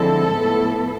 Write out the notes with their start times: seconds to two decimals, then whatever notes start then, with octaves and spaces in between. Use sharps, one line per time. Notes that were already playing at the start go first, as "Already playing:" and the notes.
Already playing: D3 F3 G#3 C4 E4 A4
0.31 A2 F3 B3 E4